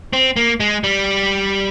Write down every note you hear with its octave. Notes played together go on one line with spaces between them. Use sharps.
C4
A#3
G#3
G3